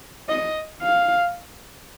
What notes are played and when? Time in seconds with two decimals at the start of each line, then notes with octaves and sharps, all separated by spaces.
0.29 D#5
0.82 F5